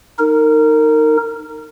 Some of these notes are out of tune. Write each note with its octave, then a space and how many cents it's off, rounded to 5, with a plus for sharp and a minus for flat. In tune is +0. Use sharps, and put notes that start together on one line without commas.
D#4 +0 A#4 -25